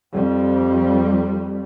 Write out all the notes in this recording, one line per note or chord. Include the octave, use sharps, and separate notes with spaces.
F2 G3